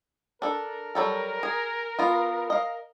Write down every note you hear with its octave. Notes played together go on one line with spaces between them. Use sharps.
D4 A4 A#4
F#3 G3 A4
G#4
B3 F4
A#4 D#5 F5